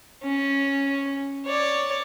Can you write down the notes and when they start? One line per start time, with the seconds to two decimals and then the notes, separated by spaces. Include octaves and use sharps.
0.24 C#4
1.46 C#5 D5